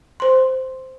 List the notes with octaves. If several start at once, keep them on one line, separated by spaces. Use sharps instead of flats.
C5 C6